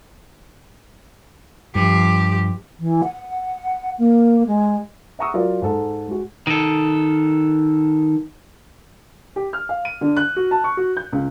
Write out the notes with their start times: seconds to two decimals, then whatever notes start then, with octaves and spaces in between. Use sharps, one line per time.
1.75 G2 F3 G4
2.79 E3
3.04 F#5
3.98 A#3
4.47 G#3
5.19 E5 F#5 A#5 C#6 D#6 E6
5.34 F#3 F4 A#4 D5
5.62 G#2 A4
6.08 G#3 F#4
6.47 D#3 A4
9.36 G4
9.53 F6
9.69 F5
9.85 D#7
10.01 D3
10.17 F#6
10.36 F#4
10.51 A5
10.64 C#6
10.77 F#4
10.97 G6
11.13 C#2